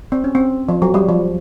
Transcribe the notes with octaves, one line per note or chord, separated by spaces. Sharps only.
C4
C#4
C4
F3
F#3
G3
F3